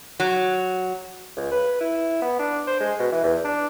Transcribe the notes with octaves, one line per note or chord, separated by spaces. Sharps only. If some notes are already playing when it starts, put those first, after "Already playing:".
F#3
C#2
B4
E4
B3
D4
C5
G#3
B2
E3
E2
D4